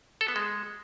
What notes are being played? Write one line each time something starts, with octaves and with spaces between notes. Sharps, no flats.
A4
B3
G#3